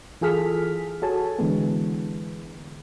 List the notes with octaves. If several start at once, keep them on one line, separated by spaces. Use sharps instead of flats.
E3 F4 G#4 A4 F6 B6
F#4 G#4 A4 C#5 G#5 A5
D3 E3 G#3 B3